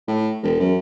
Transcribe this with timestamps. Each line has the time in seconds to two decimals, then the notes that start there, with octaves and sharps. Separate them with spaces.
0.07 A2
0.42 E1
0.59 F#2